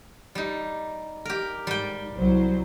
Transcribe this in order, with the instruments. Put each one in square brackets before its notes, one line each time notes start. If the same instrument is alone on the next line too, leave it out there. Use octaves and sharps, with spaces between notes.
[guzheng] G3 D#4
G4 A#4
[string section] G#2 [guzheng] G3 G5
[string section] C2 F#3 C5